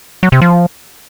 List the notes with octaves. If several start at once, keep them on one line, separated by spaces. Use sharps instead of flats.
F#3
C3
F3